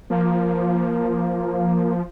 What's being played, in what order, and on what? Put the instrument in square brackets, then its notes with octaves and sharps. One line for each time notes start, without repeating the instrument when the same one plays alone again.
[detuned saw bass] F3 [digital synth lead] A#3